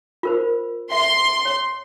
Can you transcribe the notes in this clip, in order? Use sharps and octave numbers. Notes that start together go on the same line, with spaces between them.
F4 A#4 C5
E5 C6
C#5